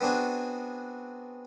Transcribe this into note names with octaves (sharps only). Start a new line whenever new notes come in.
B3 C4 D4 F#4 G#4